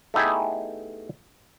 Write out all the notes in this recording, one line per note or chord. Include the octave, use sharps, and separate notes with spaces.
A3 B3 D#4 E4 G4 G#4